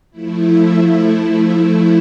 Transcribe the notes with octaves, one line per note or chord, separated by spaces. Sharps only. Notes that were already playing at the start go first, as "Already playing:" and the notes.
F3 A3 E4